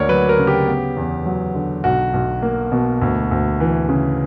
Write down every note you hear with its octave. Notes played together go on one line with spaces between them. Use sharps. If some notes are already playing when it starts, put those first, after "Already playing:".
Already playing: D2 A#3 A#4 C#5 D5
F#3 B4
A#4
C#3
G4
B3
E2
F#3
D3
B1 F#4
B1
A#3
B2
D2
D2
E3
C#3